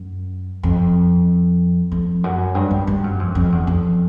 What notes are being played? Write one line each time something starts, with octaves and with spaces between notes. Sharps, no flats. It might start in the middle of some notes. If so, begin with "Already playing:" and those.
Already playing: F#2
F2
F2
F#2
G2
G2
G2
F#2
F2
F2
E2
F2